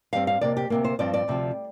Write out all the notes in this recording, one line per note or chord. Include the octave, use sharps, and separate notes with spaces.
G2 G3 C4 F5
F5
F2 C3 A#3 D5
G4
D2 C3 A#3
C5
G2 F3 C4 D5
D5
D2 C3 F3